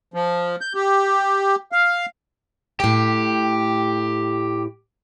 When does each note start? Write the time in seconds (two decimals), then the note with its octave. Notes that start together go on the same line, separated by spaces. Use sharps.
0.14 F3
0.61 G6
0.75 G4
1.72 F5
2.80 A2 G4 G5